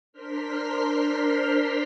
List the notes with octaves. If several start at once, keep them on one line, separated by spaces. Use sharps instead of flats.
D4 A#4 C5 C6 F6 B6